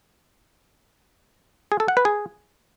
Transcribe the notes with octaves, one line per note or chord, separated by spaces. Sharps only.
G#4
A4
F#5
B4
G#4